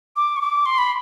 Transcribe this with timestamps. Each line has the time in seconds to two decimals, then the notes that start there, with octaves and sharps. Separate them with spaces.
0.16 D6
0.37 C#6
0.41 D6
0.66 C6
0.78 B5